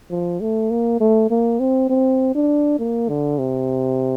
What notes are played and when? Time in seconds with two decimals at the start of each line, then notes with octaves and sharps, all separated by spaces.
0.11 F3
0.41 A3
0.71 A#3
1.00 A3
1.30 A#3
1.60 C4
1.90 C4
2.35 D4
2.79 A#3
3.09 D3
3.39 C3